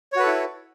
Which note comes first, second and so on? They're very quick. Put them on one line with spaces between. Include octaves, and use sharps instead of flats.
C#5 F#4 B4 A4 E4